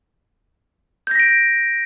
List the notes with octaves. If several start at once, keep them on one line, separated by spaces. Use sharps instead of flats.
G6 A#6 B6 D7